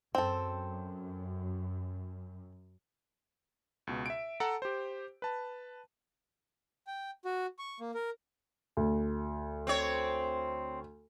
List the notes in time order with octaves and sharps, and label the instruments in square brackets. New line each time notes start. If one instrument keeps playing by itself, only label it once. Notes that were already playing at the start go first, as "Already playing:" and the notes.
[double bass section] F#2 [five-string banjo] C4 A4
[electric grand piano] C#2 B2
E5 D7
A4 F#5 A5 A#5
G4 C5
B4 A5
[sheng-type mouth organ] G5
F#4
C#6
A#3
A#4
[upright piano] D2
[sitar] C4 C#5